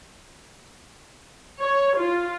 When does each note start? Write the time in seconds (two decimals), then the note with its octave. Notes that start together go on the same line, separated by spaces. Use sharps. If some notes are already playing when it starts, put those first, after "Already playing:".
1.62 C#5
1.98 F4